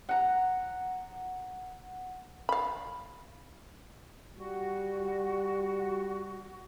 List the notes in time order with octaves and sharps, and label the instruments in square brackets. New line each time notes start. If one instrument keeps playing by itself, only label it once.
[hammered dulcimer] F#5 A#5
[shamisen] F5 B5
[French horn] G3 [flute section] F#4